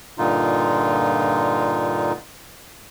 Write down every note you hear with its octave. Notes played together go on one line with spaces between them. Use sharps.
G2 A#2 D3 D#4 F4